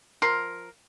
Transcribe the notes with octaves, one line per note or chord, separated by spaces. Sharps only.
F3 A#4 C6